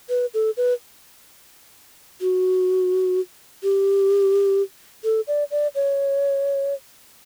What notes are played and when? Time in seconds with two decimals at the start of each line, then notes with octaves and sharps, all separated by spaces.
0.09 B4
0.34 A4
0.57 B4
2.21 F#4
3.63 G4
5.04 A4
5.27 D5
5.51 D5
5.75 C#5